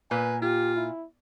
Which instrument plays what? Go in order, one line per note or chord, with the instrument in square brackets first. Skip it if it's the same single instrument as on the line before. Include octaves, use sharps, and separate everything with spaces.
[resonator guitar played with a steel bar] A#2 [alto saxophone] B4 [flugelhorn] G#5
[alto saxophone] F4 [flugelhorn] G4
[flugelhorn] E4